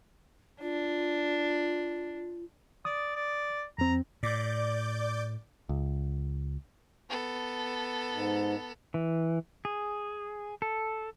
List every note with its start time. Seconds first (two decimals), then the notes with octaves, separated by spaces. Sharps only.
0.62 D4 F4
2.85 D5 D#6
3.16 D5
3.78 F2 C4 A#5
4.23 A2 D5 D6 G6
5.69 C#2
7.10 B3 A4
8.13 G#2
8.94 E3
9.65 G#4
10.62 A4